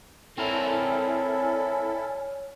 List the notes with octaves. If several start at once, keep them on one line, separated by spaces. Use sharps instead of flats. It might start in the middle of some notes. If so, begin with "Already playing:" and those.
C4 E4 A4 A#4 C#5 D5 G#5 F6